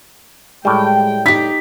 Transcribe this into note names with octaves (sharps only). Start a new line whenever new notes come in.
A2 G3 G#3 G5
D#4 G4 B6